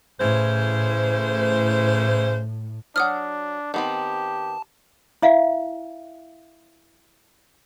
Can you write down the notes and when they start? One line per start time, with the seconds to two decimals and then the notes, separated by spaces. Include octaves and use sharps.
0.20 A2 C#3 E3 C5
2.96 F3 F#3 D4 F#5 D#6 F6
3.74 D#3 B3 C4 G4 A5
5.22 E4 E5 F5